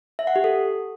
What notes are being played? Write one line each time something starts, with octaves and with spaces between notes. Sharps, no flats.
E5
F#5
G4
A4